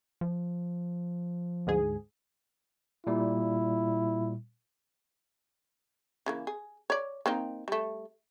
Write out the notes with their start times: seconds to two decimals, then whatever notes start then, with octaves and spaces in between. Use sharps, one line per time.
0.21 F3
1.67 D2 G#2 G#4
3.07 A#2 G3 E4
6.26 C#3 E3 A#3
6.47 G#4
6.90 C#5 D5
7.26 A#3 C4 D#4
7.68 G3 A3